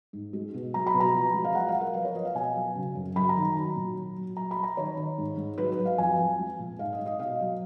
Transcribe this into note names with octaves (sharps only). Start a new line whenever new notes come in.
G#2
G#3
B2
F#3 A#5
B5
B2
A#5
F3
G#3
F5
F#3 F#5
F5
F#3
A#4
F3 B4
C#5
F3 D#5
F5
B2 G#5
F#3
C#3
F#2
F#2 B5
A#5
D#3
F#3
A#2
F#3
F#3
F#3 A#5
B5
F#3
A#5
D#3 C#5
D#3
G#2
G#2
F#3 B4
B4
F#3
F5
F2 G#5
F2
G#3
A#2
G#2 F5
D#5
G#2
D#5
B2 F5
F#3